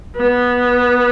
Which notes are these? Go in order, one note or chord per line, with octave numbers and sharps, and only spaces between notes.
B3